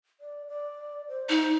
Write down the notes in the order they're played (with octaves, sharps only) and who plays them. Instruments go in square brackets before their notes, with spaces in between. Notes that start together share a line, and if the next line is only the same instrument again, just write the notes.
[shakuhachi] D5
D5
C5
[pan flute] D#4